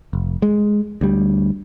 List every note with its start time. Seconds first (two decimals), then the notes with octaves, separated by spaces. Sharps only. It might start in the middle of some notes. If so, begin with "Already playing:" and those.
0.13 F1
0.42 G#3
1.01 D2 G3